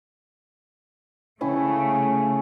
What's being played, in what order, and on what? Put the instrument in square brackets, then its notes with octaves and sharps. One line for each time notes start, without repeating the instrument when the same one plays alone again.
[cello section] C#3 A3 [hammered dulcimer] C#4 E4 G5